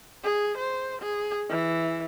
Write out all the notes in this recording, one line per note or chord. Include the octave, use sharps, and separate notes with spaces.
G#4
C5
G#4
E3